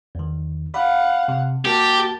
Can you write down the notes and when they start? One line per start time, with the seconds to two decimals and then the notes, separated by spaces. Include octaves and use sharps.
0.15 E2 D#3
0.74 F5 F#5 B5
1.28 C3
1.65 A#3 F#4 G4 A#4 A5